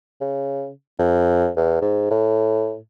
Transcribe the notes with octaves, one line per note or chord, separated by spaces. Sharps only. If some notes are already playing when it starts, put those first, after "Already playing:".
C#3
F2
E2
G#2
A2